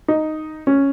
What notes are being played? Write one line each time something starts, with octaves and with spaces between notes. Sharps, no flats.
D#4
C#4